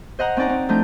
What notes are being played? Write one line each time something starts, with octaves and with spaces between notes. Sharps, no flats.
C5 D#5 F#5 A#5
C4 C#4 D#4 D5 F#5 A#5
C4
F3 A3 D4 D#4 G6